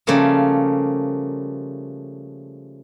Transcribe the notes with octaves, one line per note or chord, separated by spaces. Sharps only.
C#3 F3 G3 A3 A#3